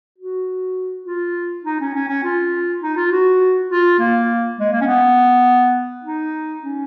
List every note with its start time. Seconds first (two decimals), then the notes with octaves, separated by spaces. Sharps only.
0.18 F#4
1.06 F4
1.64 D#4
1.80 C#4
1.94 C#4
2.08 C#4
2.23 F4
2.81 D#4
2.96 F4
3.11 F#4
3.70 F4
3.99 A#3
4.58 G#3
4.72 A#3
4.81 C#4
4.86 B3
6.04 D#4
6.62 C#4